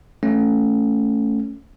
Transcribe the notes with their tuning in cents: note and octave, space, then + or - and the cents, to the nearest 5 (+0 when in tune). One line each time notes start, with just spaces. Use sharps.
A3 +0 C#4 +0